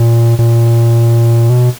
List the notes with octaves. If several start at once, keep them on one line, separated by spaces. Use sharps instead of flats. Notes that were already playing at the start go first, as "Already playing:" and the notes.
Already playing: A#2
A#2
B2